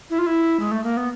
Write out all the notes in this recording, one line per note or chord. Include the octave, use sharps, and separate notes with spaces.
E4
F4
E4
G#3
A3
A#3
B3